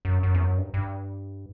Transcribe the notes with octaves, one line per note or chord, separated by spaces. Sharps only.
F#2
F#2
E2
F#2
G2
G2